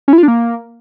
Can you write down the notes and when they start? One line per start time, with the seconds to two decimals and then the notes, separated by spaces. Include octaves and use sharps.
0.08 C#4
0.13 E4
0.18 F4
0.23 D4
0.28 A#3